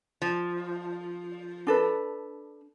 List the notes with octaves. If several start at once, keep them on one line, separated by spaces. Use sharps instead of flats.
F3
D4 A4 B4